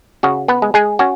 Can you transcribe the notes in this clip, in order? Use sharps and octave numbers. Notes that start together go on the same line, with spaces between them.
C#3 F#4
B3 B4
G#3
G#3 G#4
C#4 F#4